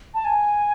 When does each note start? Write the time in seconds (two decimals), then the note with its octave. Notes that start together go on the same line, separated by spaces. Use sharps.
0.14 A5
0.25 G#5